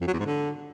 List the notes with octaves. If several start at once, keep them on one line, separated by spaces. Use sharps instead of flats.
F2
F#3
E2
G#2
D3